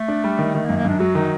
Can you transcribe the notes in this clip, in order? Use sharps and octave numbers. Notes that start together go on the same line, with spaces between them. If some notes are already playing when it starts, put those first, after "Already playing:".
Already playing: A3
D4
G3
D#3
D#3 A3
A#3
F#2
A#3
F#2 D4
F#3 F#4
D#3 D#4